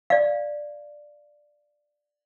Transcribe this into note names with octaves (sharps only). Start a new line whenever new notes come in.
D5 F5